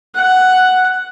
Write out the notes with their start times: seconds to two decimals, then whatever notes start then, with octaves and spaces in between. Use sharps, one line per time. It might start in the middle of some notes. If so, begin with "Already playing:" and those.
0.15 F#5